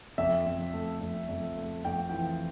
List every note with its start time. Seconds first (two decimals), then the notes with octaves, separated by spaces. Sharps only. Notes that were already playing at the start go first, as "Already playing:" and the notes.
0.18 F2 E5
0.46 F2
0.74 A3
1.01 F2
1.29 F2
1.57 A3
1.84 F2 G5
2.10 E3 G5